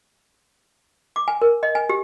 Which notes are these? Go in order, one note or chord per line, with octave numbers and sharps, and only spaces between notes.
D6
G#5
A#4
D#5
G#5
G4